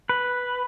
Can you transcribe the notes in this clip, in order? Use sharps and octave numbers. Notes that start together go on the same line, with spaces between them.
B4